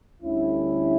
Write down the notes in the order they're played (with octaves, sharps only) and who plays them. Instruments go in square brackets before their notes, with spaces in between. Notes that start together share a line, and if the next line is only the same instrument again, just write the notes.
[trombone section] D2 D3 G3 C#4 E4